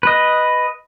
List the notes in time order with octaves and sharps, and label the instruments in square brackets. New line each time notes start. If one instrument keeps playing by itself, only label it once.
[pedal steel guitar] B4 D#5